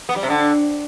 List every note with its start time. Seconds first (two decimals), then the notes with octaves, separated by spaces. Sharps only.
0.09 B3
0.16 G3
0.23 C3
0.30 D3